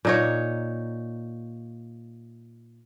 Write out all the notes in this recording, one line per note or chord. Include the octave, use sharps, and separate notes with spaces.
A#2 D#4 C#5